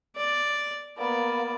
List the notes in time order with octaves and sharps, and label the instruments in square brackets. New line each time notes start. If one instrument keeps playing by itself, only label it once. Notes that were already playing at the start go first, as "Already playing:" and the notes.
[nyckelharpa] D5
[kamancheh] A#3 B3 [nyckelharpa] D5